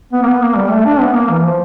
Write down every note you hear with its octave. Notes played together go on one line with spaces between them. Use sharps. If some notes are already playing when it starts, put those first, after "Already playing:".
B3
A#3
B3
A#3
G3
A3
D4
B3
A#3
E3
F3